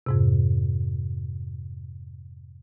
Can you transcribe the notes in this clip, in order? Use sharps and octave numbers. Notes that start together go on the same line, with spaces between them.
F2 G#2 C3